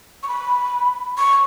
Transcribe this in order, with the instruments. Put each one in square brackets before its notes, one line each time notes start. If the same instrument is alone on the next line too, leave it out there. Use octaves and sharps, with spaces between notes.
[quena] C#6
B5
C#6